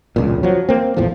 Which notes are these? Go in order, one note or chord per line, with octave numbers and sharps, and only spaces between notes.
E1 C#2 A#2
F3 F#3
A#3 C4
A#1 E2 A2 F3